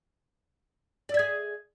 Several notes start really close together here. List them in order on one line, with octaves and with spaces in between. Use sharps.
D5 E5 G#4